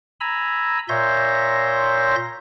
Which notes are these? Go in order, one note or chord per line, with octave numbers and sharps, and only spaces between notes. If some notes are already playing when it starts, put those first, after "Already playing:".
G#5 A#5 B5 E6
A#2 C#5 E5 C6 G6 A#6